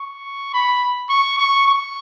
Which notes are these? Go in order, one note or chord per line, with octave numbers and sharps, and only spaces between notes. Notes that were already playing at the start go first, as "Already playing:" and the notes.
Already playing: C#6
B5
C#6
C#6
C#6